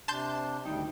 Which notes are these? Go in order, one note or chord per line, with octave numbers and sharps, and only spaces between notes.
C3 D4 A5 C6 G6
D2 A2 D#3 G3 D#4 G5